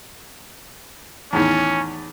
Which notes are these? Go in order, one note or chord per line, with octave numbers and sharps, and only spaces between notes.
E2 A2 D#3 C#4